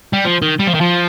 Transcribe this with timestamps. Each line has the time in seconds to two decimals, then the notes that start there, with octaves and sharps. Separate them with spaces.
0.13 G3
0.25 F3
0.42 D#3
0.59 G3
0.67 F3
0.74 D#3
0.81 F3